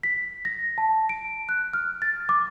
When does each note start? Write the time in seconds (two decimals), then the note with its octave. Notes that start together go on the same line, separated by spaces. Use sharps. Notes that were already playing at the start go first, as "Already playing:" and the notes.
0.03 B6
0.45 A#6
0.78 A5
1.09 D7
1.49 F#6
1.73 F6
2.02 A6
2.29 D6